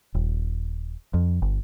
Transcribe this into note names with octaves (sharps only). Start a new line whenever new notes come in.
D#1
F2
G1